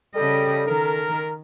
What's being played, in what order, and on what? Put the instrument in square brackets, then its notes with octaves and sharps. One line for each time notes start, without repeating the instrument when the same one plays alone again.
[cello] C#3 D#5 [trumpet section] G3 [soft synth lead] A4
[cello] D#3 [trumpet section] A#4